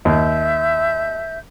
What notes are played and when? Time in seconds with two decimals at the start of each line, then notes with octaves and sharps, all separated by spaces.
0.05 D#2 E5 G6